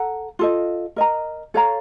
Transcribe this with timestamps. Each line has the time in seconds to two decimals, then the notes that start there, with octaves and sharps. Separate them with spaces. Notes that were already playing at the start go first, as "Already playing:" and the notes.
Already playing: A4 F#5 A#5
0.39 F4 A4 D#5
0.96 A#4 D#5 A#5
1.54 A4 C#5 F5 A#5